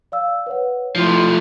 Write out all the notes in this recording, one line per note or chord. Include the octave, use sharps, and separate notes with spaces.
D5 F5 E6
B4 C#5 F#5
F3 A3 E4 F4 C6